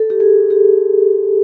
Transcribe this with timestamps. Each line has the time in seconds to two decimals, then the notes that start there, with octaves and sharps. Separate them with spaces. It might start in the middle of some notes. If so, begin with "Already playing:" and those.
Already playing: A4
0.10 G4
0.20 G#4
0.50 G4